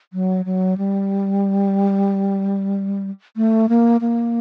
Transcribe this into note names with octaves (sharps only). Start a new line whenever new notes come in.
F#3
F#3
G3
A3
A#3
A#3